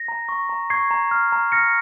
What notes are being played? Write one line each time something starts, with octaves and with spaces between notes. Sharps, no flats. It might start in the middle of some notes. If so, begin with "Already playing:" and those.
Already playing: A#6
A#5
C#6
A#5
C#6 G#6 C7
A#5
F6
A#5
F6 A#6 C#7